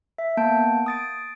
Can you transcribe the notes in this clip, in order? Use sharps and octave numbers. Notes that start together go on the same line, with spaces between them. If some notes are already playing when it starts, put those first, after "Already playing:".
E5
A#3 B3 A5 G6 D7
D#6 A6 D7